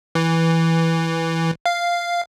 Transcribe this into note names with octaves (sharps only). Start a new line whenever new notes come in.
E3
F5